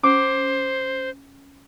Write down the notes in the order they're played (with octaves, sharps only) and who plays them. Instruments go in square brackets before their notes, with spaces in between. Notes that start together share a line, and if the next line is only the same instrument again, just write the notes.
[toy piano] C#4 [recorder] C5 [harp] D6